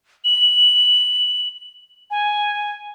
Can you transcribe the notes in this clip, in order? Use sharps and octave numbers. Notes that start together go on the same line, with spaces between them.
F#7
G#5